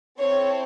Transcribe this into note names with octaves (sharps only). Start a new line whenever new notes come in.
C4 E4 A4 C#5